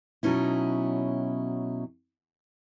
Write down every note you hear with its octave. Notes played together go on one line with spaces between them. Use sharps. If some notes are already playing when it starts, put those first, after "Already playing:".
B2 F#3 C#4 D#4 E4